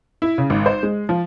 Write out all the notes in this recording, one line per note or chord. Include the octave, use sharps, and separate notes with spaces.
E4
C#3
G#1
C5
G#3
F3